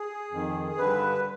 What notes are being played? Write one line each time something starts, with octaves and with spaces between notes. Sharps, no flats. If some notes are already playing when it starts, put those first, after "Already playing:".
Already playing: G#4
F2 D#3
G2 D3 B4